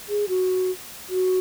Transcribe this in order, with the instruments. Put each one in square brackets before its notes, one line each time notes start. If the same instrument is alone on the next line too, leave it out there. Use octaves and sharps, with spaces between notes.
[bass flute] G#4
F#4
F#4